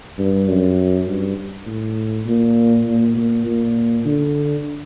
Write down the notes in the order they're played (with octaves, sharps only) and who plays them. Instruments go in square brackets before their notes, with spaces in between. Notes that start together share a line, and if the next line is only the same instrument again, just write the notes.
[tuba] G2
F#2
G2
A2
A#2
A#2
A#2
A#2
D3